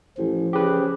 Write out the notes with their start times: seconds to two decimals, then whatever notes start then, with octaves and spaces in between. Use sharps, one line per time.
0.18 A1 F3
0.53 C#3 G4 B4